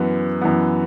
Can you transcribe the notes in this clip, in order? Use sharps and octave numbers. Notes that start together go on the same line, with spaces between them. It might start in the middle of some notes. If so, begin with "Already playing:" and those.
Already playing: F#2 E3 B3
F#2 E3 B3